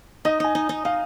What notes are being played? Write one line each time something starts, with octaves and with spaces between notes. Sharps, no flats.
D#4 D#5
D#4 G#5
D#4
D#4
D#4 F5